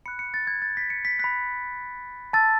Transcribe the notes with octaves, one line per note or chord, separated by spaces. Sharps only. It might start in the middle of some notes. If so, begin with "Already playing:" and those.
B5 F#6 C#7
C#7
A6
G#6
A6
B6
C#7
B6
B5 F#6 B6
A5 E6 A6